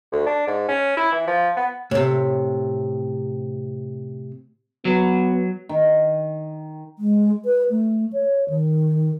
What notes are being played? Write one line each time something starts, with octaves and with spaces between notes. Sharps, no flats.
D2
D4
G#2
C#4
E4
E3
F3
B3
A2 C3
F#3 B3
D#3
G#3
B4
A3
C#5
D#3